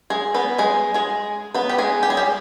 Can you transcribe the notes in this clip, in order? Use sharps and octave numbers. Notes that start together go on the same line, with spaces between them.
G#3 G#4
B3 B4
G#3 G#4
G#3 G#4
B3 B4
G4
G#3 G#4
G4
G#4
G3 G4